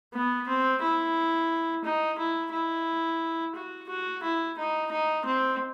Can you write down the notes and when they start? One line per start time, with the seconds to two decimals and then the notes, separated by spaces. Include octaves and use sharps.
0.14 B3
0.48 C4
0.82 E4
1.84 D#4
2.19 E4
2.53 E4
3.55 F#4
3.89 F#4
4.23 E4
4.58 D#4
4.92 D#4
5.26 C4